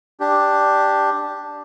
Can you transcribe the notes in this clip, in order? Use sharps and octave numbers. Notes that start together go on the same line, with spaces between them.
D4 G4